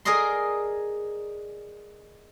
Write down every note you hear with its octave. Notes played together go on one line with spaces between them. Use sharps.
G#4 A#4 D5 D#5 C6